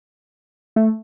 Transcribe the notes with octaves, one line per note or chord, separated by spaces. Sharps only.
A3